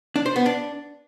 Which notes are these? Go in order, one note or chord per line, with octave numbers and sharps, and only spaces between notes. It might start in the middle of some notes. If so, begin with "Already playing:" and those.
D4
C5
B3
D4